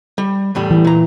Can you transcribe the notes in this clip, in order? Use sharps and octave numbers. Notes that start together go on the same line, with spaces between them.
G3
E2 A2 G3
E3
A#2 A#5